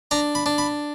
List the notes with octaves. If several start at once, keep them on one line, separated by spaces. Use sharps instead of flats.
D4 A#5
B5
D4
B5